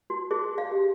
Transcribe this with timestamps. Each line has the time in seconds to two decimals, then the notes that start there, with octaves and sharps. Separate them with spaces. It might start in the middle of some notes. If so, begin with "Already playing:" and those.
0.10 F#4
0.31 G#4
0.58 F5
0.71 G4